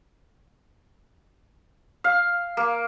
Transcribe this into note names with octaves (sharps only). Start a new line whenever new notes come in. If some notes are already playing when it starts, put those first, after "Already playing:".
F5
A#3